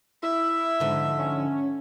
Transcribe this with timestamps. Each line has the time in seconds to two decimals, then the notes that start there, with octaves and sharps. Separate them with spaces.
0.23 E4 E5
0.80 G#2 D3 F3
1.19 C#4